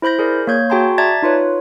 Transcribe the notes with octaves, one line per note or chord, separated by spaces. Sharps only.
E4 C5 B5 G6 A#6
G#4 A#4 D5
A#3 C#5 G6 G#6
F#4 G#4 G5 A5 A#5 C6
D5 E5 A5 A#5 G#6 A6
D#4 F4 B4 C#5